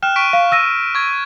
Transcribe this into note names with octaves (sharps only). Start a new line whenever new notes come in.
G5 F6 F#6 E7
C#6 B6 D7
F5
E6 A#6 D#7
C#6 G#6